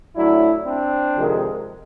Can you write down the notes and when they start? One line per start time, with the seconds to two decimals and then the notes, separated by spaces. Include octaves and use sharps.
0.15 A2 F#3 D4 E4
0.65 C4 D4
1.14 F2 C3 D#3 G#3